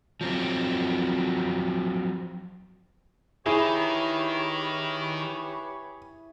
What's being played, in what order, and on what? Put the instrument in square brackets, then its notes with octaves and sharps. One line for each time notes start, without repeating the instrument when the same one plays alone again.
[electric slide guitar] F3 F#3 C4
[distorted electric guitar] D#3 [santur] E4 [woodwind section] G4 B4 C#5 [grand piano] G#4